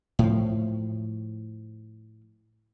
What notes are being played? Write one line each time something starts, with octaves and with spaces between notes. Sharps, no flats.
A2 F3